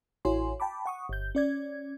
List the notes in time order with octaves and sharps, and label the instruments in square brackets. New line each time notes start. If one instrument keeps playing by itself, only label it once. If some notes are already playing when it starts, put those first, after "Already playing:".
[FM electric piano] A1 E4 F#4 C#5 G#5 C6
G5 A5 B5 D6
F#5 C#6 D#6
G1 G6
C#4 D5 G#6